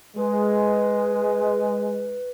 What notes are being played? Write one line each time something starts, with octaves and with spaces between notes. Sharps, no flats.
G#3 B4